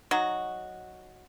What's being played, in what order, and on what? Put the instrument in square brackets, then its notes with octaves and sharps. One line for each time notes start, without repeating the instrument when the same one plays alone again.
[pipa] F#3 D#4 F#4